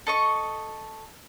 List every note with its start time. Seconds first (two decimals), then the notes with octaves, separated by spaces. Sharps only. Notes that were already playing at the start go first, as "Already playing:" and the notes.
0.07 A4 D#5 C#6